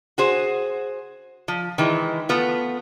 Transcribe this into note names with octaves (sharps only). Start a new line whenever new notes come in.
F#4 G#4 C5
F3
D#3 E3 G#3
A3 B3 F4